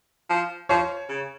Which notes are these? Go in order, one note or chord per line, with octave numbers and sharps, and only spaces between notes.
F3
F3 C#5
C#3